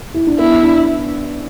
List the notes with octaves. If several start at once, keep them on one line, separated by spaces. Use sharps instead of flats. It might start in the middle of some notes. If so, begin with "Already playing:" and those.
E4
D4
B3 E4
D4